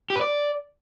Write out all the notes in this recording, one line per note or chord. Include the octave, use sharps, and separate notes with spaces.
G4
B4
D5